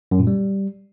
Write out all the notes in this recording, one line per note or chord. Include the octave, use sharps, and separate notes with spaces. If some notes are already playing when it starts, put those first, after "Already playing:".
F#2
A#2
G3